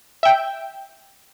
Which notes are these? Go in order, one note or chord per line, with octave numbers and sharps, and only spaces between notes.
E5 G5